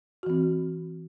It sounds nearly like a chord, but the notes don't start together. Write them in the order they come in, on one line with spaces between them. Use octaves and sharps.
F#4 E3 C4